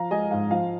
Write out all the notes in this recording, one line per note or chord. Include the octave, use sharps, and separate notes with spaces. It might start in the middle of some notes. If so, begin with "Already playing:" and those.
Already playing: F3 F5 A#5
G#3 D#5 G#5
G#2 F5
F3 F5